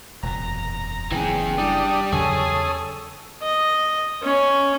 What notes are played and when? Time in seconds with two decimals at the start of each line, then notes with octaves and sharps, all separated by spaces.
0.23 E1 F#2 A#2 A#5
1.12 F#1 E3 C#4 G#4 G5
1.58 G3 D4 D#6
2.12 E2 C#3 F#3 G#4 A4 C#5 D#6
3.42 D#5
4.23 C#4